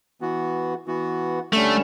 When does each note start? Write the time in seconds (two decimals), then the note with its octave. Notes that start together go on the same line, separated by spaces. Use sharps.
0.21 E3 B3 F#4
0.87 E3 B3 F#4
1.52 D3 G3 A3 C#4